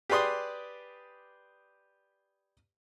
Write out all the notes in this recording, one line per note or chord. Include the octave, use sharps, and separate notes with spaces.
G4 G#4 B4 D5 C6 D#6